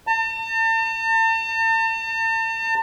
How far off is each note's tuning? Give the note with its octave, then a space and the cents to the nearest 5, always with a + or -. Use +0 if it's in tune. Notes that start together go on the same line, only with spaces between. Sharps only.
A5 +40